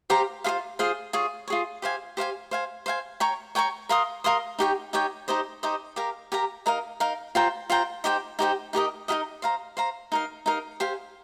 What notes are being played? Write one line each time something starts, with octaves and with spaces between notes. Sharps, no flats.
G4 C5 F5 A#5
F4 G#4 C5 F5
F4 G#4 C5 F5
F4 G#4 C#5
F4 G#4 C#5
G4 C5 F5 G#5
G4 C5 F5 G#5
C5 F5 G#5
C5 F5 G#5
C#5 G5 A#5 C#6
C#5 G5 A#5 C#6
A#4 F5 C6 D#6
A#4 F5 C6 D#6
D#4 G4 C#5 G5
D#4 G4 C#5 G5
D#4 G4 C5 D#5
D#4 G4 C5 D#5
G4 A#4 F5 A#5
G4 A#4 F5 A#5
D#4 A#4 F5
D#4 A#4 F5
F4 C5 G5 A#5
F4 C5 G5 A#5
D#4 G4 C5 G5
D#4 G4 C5 G5
D#4 G4 A#4 D#5
D#4 G4 A#4 D#5
C5 F5 A#5
C5 F5 A#5
D#4 A#4 F5
D#4 A#4 F5
G4 C5 F5 G#5